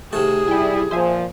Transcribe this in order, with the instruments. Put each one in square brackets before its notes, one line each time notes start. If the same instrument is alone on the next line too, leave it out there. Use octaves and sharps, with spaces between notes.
[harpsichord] C3 D#3 F#4 [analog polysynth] A3 [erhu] G#4
[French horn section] G3 E4 [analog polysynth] G5 G#5
[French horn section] A#2 F3 [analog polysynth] C5 E5 G#5